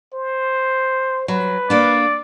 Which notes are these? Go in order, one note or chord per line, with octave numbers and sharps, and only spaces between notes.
C5
F#3 B4
A#3 D4 D5